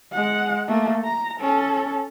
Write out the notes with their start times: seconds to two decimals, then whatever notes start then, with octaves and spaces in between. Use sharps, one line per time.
0.12 G#3 F#5
0.67 A3 A#3
1.04 A#5
1.40 C#4 A4